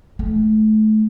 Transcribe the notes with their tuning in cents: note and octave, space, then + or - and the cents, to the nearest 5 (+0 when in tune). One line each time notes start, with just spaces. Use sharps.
A3 -30